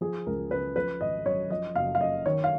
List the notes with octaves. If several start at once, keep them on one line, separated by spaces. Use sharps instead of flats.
F3 G#4
C#2 A#4
C#3 B4
F3 B4
G#1 D#5
F#2 C#5
F3 D#5
F#1 F5
F5
F#2 D#5
D#3 C#5
F5